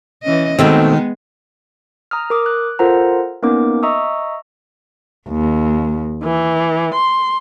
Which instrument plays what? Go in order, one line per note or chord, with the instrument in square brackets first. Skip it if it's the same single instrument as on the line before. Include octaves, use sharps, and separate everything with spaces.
[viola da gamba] E3 C#4 D#5
[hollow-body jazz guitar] B2 A3 C4 [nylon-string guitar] D#3 [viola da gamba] G#3 B3
[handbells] A#5 D#6 F6
A#4 D6 D#6
F#6
F4 A4 A#4 C5 F#5 A#5
A#3 B3 C#4 D#4 A#4 D6
D#5 E5 A#5 C#6 D#6 E6
[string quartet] D#2
E3
C6